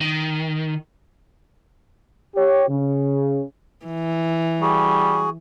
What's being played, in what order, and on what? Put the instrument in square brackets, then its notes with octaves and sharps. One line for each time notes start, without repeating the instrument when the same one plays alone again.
[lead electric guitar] D#3
[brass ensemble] G4 C#5
C#3
[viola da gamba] E3
[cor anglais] G3 [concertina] F#4 G#4